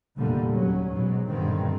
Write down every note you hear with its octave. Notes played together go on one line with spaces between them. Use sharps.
F1 E2 A#2 D3 G3 A#3
D#2 F#3 C#4
G#2 B2 F#3
B1 G2 A#2 D3 D#3 C4